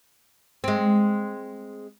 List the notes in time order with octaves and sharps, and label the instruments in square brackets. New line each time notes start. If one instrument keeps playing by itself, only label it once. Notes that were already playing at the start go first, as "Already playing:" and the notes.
[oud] G#3 C4